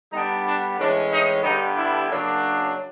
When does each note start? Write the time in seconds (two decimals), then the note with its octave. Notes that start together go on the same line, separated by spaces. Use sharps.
0.13 D3 G3 B3 D4 D#4
0.46 D4
0.78 A2 E3 G#3 C#4 D4
1.11 D#4
1.43 G2 D3 G3 B3 D#4
1.76 D4 E4
2.08 F#2 C#3 F#3 A#3 D4